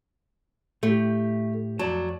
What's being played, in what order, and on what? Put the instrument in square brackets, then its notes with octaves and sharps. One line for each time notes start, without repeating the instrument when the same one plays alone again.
[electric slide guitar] A2 G4 [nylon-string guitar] A3
[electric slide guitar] F2 D5 A5 [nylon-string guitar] F#3